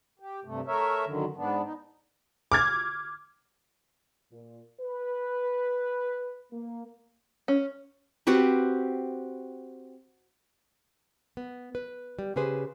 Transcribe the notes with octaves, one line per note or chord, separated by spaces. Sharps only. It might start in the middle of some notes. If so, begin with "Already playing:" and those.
G4
G2 C3 A3
A3 A#4 C#5 E5
F#2 D3 D#3
G#2 B3 D4
D#4
D6 F6 G#6
A#2
B4
A#3
C#4
C4 F#4 G4 B4
B3
B4
G3
C#3 G4 G#4 B4 C5